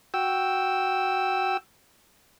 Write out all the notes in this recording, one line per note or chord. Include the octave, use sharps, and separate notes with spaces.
F#4 G5 E6